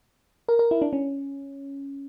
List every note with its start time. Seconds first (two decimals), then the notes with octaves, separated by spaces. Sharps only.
0.48 A#4
0.59 A#4
0.71 E4
0.82 D4
0.93 C#4